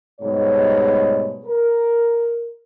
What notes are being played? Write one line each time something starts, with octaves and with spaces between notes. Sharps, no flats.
G#2 B2 G3 A3 C#5
A#4